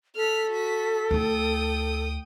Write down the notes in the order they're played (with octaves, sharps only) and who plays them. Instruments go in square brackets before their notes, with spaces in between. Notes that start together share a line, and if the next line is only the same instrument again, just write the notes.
[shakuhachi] A4 [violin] F6 B6
[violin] F#4 B6
[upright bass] D2 E4 [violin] G5 D#6